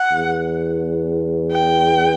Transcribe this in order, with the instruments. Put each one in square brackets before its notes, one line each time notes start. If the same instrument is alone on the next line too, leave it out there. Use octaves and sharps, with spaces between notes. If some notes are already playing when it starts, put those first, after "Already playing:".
Already playing: [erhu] F#5
[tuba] E2
[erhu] G5